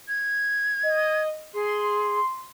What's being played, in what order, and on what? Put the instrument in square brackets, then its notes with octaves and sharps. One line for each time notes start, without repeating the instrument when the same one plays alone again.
[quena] G#6
[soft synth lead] D#5
[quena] G#4 [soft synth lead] C6